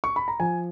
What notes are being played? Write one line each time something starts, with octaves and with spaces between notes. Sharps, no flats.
C#6
B5
A#5
F3 G#5